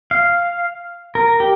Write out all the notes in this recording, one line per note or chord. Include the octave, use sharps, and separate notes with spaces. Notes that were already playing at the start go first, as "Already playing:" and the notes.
F5
A#4
G4